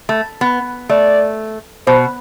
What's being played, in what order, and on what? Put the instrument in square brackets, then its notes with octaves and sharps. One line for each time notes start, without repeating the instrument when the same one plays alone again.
[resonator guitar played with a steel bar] A3
B3
[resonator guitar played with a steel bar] A3 [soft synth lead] D5
[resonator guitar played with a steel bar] B2 [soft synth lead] C5